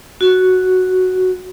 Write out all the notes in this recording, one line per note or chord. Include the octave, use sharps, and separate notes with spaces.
F#4